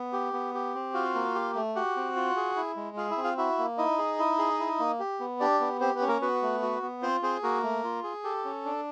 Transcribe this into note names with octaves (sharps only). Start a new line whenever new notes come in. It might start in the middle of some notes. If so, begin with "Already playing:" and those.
Already playing: B3
G4
B3
G4
C4
F4 F#4 F5
A#3
G4
A3
F#4 G4 F#5
C4
F4
G#4
E4
G#3
F4 G#4 F5
E4 E5
C4
F4 F5
E4 F#4 E5
A#3
D#4 E4 D#5
G#4
E4
G#4
E4
A#3
G4
B3
D4 G4 D5
B3
C4 G4 C5
B3 B4
C#4
A#3 A#4
B3 F#4 B4
A3
F#4
B3
C4 F4 C5
C4 G#4 C5
A#3 F#4 A#4
A3
F4
G#4
G4 A4
C#4
D4